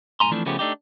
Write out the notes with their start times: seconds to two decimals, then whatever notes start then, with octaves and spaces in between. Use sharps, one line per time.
0.20 B1 A2 G#5 A#5 C6
0.32 E3 F3 A3 C4 D4
0.46 C#3 F3 A3 B3 C#4 G4
0.59 A3 D4 D#4 G4